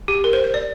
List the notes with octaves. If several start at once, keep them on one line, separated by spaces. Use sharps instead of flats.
G4
A#4
C5
C5
D5